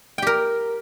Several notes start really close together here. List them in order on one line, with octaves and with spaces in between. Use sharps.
G5 G4 A#4